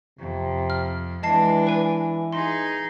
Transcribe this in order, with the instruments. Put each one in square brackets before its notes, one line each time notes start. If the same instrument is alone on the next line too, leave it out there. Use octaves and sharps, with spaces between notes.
[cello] F2 [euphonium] C3
[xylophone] F6
[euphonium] E3 [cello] G#3 D4 [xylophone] D#5 A5 C7
[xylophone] B4 G#5
[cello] D#4 G#4 [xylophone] C6